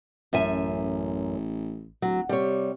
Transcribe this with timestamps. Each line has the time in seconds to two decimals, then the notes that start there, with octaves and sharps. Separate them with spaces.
0.33 A1 F#2 E5 G#5
2.02 D1 F#3
2.29 C3 G3 C#5